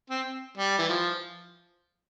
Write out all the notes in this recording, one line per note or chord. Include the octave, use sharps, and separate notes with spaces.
C4
G3
E3
F3